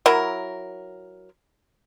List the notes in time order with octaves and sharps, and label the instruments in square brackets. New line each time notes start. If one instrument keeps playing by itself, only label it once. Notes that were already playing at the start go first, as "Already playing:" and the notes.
[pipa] F#3 E4 A#4